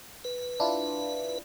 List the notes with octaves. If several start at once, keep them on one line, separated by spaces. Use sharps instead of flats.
B4
D4 E4 F4